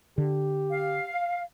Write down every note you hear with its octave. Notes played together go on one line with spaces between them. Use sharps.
D3 G4
F5